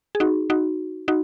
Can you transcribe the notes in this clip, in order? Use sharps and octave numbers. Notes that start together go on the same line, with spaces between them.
G#4
D#4 F#4
D#4 F#4
D#4 F#4